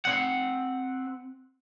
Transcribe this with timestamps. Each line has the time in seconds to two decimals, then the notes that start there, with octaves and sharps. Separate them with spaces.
0.05 C4 F#5